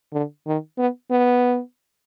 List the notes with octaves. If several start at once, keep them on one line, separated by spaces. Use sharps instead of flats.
D3
D#3
B3
B3